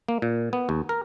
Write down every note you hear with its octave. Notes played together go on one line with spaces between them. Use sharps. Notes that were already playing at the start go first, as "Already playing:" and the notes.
A#3
A#2
B3
D#2
A#4